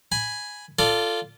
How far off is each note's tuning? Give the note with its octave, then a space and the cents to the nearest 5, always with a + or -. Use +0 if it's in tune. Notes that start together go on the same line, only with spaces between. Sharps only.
G#5 +0 B5 +0
F4 -10 A4 +10 D5 +0